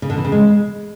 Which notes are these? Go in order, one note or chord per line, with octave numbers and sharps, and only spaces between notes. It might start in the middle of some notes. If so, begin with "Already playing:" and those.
C#3
D3
E3
C#3
G#3